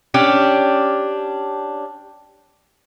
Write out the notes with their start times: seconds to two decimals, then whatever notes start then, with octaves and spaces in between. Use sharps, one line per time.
0.14 C#4 D4 G4